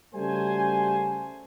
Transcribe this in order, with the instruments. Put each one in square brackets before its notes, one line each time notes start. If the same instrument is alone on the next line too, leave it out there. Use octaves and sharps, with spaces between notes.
[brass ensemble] C#3 G3 A3 F#4 C5 G#5